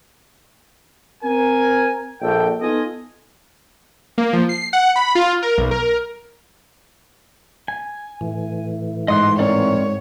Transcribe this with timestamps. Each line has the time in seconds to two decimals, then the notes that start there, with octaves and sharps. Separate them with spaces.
1.23 C4 A#4 G#5
2.21 A#1 A4 G5
2.60 B3 D#4 F4 A4 D#5 G#5
4.18 A#3
4.33 F3
4.49 C7
4.73 F#5
4.96 B5
5.15 F4
5.42 A#4
5.58 B1
5.71 A#4
7.68 G#5
8.21 A2 E3
9.08 G#2 D#5 C6 D#6 F#6
9.39 C4 A#4 C#5 D5